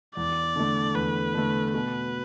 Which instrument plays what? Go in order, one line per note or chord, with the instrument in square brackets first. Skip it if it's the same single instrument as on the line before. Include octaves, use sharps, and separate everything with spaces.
[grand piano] E2 [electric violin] D5
[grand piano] D3 A3
[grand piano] E2 [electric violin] B4
[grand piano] D3 A3
[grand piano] B2 [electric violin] B4